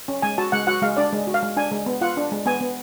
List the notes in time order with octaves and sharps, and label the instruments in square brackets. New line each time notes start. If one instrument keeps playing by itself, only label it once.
[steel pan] C#4
G#3 G#5
F#4 A5
G#3 F#5
F#4 F#5
G#3 F5
D4 D5
G#3
F#4
F5
G#3
D4 G#5
G#3
B3
F4 F#5
D4
G#3
B3 G#5
B3